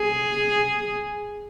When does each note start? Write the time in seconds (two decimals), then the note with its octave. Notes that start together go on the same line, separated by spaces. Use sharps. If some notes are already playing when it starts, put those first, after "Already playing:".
Already playing: G#4